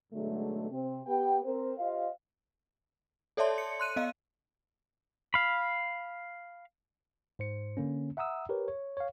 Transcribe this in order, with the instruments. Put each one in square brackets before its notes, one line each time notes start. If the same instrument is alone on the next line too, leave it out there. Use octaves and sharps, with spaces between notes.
[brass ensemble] G#2 B2 D3 F#3 G#3 A3
C3 C4
B3 G4 G5
C4 A#4 C5
F4 G4 C5 D#5 F5
[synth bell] A4 C#5 D5 E5 A5 C6
C#7
C6 F#6 D#7
B3 D#5 F5 D#7
[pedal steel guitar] F5 B5
[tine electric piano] G#2 C5 C#7
D3 A#3 C#4
E5 F#5 A#5 D#6 E6
G4 A#4 B4 C#5
C#5
C#5 F5